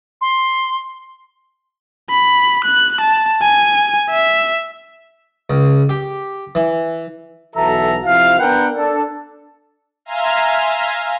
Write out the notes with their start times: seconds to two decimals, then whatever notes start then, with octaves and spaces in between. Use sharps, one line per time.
0.21 C6
2.10 B5
2.64 F#6
3.01 A5
3.42 G#5
4.10 E5
5.50 C#2
5.89 G4
6.55 E3
7.56 B1 E3 F#4 A4 E5 A#5
8.06 C3 F3 E4 F5
8.39 B3 D4 A#4 B4 F#5 G5
8.75 D4 A4
10.05 E5 F5 G#5 A#5 C6 F6